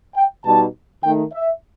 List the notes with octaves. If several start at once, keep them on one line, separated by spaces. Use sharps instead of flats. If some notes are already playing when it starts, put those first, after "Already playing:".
G5
B2 G3 D#4 A5
D#3 A3 D#4 G5
E5